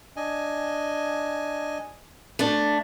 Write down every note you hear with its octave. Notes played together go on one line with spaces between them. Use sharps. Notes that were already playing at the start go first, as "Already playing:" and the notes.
D4 D#5 G#5
A3 D4